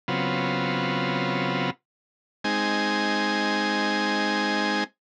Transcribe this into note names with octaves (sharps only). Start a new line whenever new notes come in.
C#3 F#3 B3 C4 F4
G#3 C4 D#4 G#5